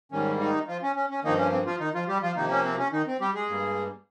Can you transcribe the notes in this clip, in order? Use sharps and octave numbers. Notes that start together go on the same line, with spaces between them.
G#2 D#3 G3 A#3 C#4
D#3 D#4
F3 F4
C#4
C#4
C#4
G2 D#3 F3 A#3 D#4
C#4
C4
F3 F4
D#3 D#4
F3 F4
G3 G4
F3 F4
C3 D#3 F3 A#3 D#4
C#4
C4
C#4
D#3 D#4
C4
G3 G4
G#3 G#4
G2 G3 A#3